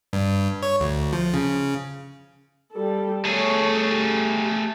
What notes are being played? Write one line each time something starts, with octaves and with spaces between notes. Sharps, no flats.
G2
C#5
D2
F3
C#3
G3 A4
A3 G#4 A4 C#5
G4